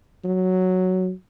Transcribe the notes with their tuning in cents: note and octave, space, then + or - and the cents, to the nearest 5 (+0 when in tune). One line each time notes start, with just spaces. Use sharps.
F#3 +0